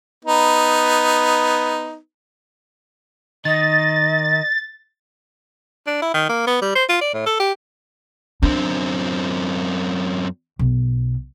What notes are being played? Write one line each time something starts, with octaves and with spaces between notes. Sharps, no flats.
B3 D#4
D#3 D#5 A6
D4
E4
D#3
A#3
B3
G3
C5
F4
D5
A2
A4
G4
F#2 C4 D4
B1